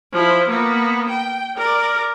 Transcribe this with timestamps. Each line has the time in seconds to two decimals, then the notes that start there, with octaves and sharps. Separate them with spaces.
0.12 F3 E4
0.48 A#3 B3
1.09 G5
1.57 A#4 D5